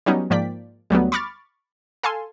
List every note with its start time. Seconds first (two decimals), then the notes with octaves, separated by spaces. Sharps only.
0.06 F#3 G3 B3 C#4 D#4
0.30 G#2 F3 A#3 D5 G5 B6
0.90 D2 F#3 G3 B3
1.12 B5 C#6 D6 F6 A6
2.03 A4 F5 G#5 A5 C6